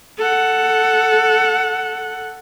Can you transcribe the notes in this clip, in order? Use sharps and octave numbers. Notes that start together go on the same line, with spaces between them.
A4 F#5